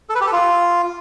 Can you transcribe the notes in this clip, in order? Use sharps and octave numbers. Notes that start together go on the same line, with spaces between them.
A4
B4
G4
A4
F4